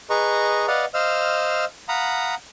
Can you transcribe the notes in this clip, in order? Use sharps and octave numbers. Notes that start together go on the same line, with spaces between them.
G#4 B4 D#5 A#5 C#6
B4 D5 D#5 F5 F#5
C5 D#5 F5 E6 F6
F5 F#5 A#5 B5 D#6